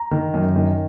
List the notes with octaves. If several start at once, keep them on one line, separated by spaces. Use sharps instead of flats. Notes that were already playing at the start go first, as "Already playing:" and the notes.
Already playing: A#5
D#3
F#2
D#3